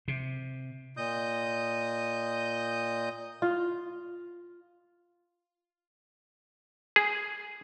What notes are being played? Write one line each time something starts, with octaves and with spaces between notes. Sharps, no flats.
C3
A#2 D#5 D#6 G6
F4
G#4